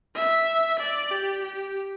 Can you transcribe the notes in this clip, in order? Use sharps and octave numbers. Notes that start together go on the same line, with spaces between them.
E5
D5
G4
G4